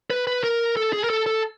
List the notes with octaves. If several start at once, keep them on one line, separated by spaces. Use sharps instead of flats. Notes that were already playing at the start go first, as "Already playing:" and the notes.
B4
B4
A#4
A4
G#4
A#4
A4
A4